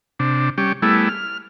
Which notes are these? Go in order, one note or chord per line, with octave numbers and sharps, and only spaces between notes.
C3 D4
G3 C#4 G4
G3 A3 B3 E4 G#4
F6